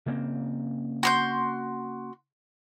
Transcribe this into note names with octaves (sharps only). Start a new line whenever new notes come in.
C#3 A#3 C4
F#4 C6 G6